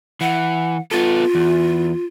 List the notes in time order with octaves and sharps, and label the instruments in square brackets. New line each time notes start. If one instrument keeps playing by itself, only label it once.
[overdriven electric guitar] E3 [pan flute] F#5
[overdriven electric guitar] B3 A4 [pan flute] F4
[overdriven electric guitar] E2